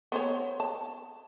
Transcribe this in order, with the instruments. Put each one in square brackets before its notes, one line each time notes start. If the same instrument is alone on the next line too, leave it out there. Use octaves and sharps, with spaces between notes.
[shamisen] B3 C5 C#5
A5